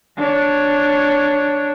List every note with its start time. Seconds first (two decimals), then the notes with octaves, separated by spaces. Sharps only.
0.17 D4 C#5